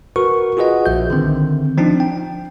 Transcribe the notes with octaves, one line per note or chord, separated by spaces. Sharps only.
F#4 A#4 B4 C#6
F4 F#4 G#4 B4 D#5 F#5
A#1 E5 G6
D3 D#3 C4
F3 C4 D4 D#4
G5